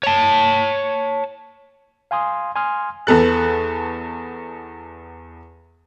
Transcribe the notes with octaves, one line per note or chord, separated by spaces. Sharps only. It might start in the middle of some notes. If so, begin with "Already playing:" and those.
C#5 A5
F5 G#5 C6 D#6
G#5 C6 D#6 F6
E2 B3 A4 F#6